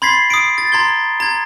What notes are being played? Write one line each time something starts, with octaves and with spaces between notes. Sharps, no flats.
B5 C6 G#6 A6 B6 C7
D#6 C7 D7
A6
A#5 C6 G#6 G7
A#5 G#6